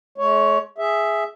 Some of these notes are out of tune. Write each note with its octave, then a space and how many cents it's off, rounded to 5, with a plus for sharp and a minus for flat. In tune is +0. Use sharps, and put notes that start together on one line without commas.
G#3 +45 C#5 +10
G#4 +0 E5 +0